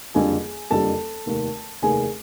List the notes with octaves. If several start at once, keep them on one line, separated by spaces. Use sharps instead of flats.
F#1 F2 D3 G3 G#4 G#5
F#1 F2 D3 G3 A4 A5
F1 D#2 D#3
F1 D#2 D#3 G#4 G#5